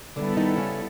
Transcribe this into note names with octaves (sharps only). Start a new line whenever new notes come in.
D3 G3 B3 D4 E4 A4
D#3 D#4
C#3 C#4